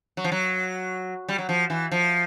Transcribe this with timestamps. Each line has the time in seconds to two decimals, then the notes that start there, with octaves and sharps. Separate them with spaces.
0.17 F#3
0.24 F3
0.32 F#3
1.28 G3
1.38 F#3
1.49 F3
1.70 E3
1.91 F3